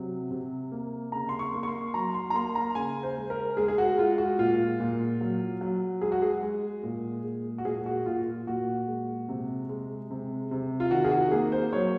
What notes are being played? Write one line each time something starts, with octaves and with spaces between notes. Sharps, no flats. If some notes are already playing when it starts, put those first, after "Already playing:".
Already playing: C3 F#3
C3
A#3
C#3 A#5
C6
C#6
A#3
C#6
C6
F#3 A#5
C6
A#5
A#3 C6
A#5
C#3 G#5
C5
G#3
A#4
G#3 G#4
G#4
F#4
G#3 F4
F#4
A#2 F4
A#2
F#3
F#3
G#3 G#4
F#4
G#4
G#3
A#2
G#3
F#4
A#2 G#4
F#4
A#2 F4
A#2 F#4
G#3
C3
G#3
C3
C3
F4
D#3 F#4
G#4
F#4
A#3 G#4
C5
F#3 C#5